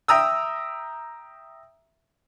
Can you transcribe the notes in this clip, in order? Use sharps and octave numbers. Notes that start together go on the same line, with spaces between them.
E5 G5 A#5 D#6 E6